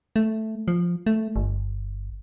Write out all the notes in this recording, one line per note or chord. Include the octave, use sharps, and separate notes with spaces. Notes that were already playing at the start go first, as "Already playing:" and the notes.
A3
F3
A3
G1